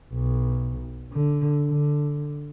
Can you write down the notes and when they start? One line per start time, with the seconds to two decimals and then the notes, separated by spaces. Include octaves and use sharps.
0.13 B1
1.12 D3
1.68 D3